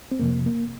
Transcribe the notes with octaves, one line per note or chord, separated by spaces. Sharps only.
C4
F2 C3 F3 A#3
A#3